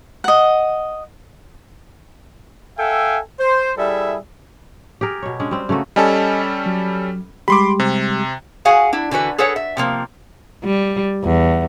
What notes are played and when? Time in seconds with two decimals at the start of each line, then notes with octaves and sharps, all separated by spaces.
0.24 D#5 F#5
2.78 A4 E5 F5 G5 G#5
3.40 C5
3.77 G3 E4 G#4 A4 E5
5.01 G4 G#4 A#4
5.22 B2 C#5
5.40 G#3 C#4 D4
5.51 G3 C4
5.69 C#3 A3 A#3 F#4
5.96 G3 C#4 A4 D#5 G#5 A5
6.66 F#3
7.48 G3 G#3 G4 B5 C6 D6
7.80 C3
8.65 F#4 G#4 F5 F#5 G#5
8.93 D4 E4
9.11 D3 E3 F#4 B4
9.38 G#4 A4 B4 C#5 F#5
9.56 E5
9.77 C3 F3 A#3
10.64 G3
11.24 E2